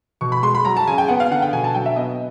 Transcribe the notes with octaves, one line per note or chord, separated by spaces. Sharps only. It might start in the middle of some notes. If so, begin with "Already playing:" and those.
B2 C#6
B5
G#3 C6
B5
F#3 A#5
A5
C#3 G#5
G5
B3 F#5
F5
D3 F#5
G5
B2 G#5
A5
F#3 G5
E5
B3 D#5